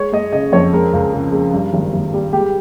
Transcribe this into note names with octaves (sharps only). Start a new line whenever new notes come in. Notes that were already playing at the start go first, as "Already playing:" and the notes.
Already playing: G#3 C#5
G#3 D#5
C#3 D#5
F2 C#5
G#3 A#4
C#2
C#3
G#3
G2
G#1
G#1
G3
G#3 G4